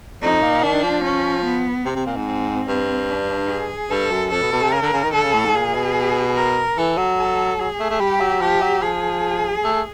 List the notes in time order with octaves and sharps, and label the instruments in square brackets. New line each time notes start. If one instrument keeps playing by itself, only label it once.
[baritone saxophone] F2 [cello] D#4
[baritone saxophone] A#2
[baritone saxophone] D#3 [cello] D4
[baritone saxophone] F3
[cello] C#4
B3
[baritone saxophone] C3 [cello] C4
[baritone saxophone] C3
A#2
G#2
[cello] C4
[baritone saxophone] G2
[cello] D4
G#4
[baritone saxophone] G2 [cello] A4
[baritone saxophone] F#2
[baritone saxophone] F2 [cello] A4
[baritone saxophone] B2
B2
C3
[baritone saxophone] C#3 [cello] A#4
[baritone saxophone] D3
C#3
D#3
[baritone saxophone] D3 [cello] A4
[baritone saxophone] C#3
A2
G#2
[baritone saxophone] A#2 [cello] G#4
[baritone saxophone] B2
[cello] A#4
[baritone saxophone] E3 [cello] A4
[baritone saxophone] F#3
[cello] A4
[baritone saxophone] F#3 [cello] G#4
[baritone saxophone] A3
A3
[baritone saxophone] G3 [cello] G4
[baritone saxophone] F#3
[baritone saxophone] F3 [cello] G4
[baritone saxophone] F#3
[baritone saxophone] F3 [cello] G#4
[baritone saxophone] A3